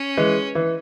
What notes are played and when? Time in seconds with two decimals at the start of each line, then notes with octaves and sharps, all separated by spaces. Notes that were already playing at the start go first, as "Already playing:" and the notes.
Already playing: C#4
0.17 E3 G#3
0.55 E3